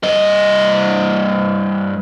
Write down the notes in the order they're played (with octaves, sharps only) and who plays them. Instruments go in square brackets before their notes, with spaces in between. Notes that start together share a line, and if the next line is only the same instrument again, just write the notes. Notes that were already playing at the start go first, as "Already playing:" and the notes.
[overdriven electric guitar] G2 D#5